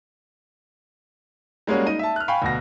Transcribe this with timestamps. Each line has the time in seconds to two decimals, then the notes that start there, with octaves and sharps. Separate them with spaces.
1.67 G3 G#3 A#3 C#4 F#4
1.86 D#4 D#5 D#7
1.99 E5 A5
2.16 F6 F#6
2.28 F5 G5 G#5 B5 C#6
2.42 D2 B2 A#6